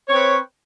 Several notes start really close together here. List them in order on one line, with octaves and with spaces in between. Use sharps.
C#5 C4 B4